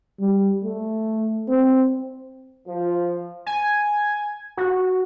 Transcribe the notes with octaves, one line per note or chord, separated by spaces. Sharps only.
G3
A3
C4
F3
G#5
F#4